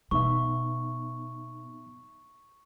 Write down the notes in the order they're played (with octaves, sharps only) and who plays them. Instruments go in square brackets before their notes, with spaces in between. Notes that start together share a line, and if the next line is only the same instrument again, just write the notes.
[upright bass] B2 [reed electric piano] B3 D#4 E5 [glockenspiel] C#6